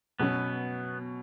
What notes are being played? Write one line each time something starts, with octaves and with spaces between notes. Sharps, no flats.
B2 F#3 B3 C#4